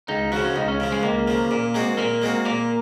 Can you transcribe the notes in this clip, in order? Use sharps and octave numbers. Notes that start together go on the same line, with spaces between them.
C#2 D#4
C#3 F3 F#4
C#4
C#2 D#4
C#4
C#3 F3
G#3
C#2 A#3
C#3 F3
A#2
G#3 C4 F#4
A#2 A#3
G#3 C4 F#4
A#2 A#3